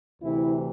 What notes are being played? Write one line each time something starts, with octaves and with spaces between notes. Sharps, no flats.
D2 C3 E3 E4